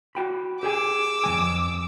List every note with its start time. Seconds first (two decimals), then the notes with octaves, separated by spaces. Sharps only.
0.15 F#4 G5 B5
0.63 G4 G#4 G#5 D6 E6
1.24 F2 E3 G#5